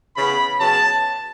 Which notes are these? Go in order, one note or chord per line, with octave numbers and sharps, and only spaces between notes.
C#3 E3 B3 B5
C#3 F#3 B3 A5